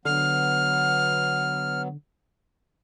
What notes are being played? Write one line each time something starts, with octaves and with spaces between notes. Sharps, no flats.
D3 F#3 B3 F6